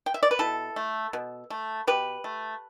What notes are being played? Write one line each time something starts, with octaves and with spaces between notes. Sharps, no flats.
G5
E5
D5
B4
B2 E4 A4
A3
B2
A3
B2 G4 B4
A3